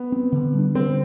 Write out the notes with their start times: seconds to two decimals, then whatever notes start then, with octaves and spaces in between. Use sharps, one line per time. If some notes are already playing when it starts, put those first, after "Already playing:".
Already playing: B3
0.12 C4
0.32 D3
0.54 G3 D4
0.75 D3 C4